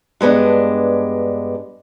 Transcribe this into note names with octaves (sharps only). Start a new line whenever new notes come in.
G2 G#3 B3 D4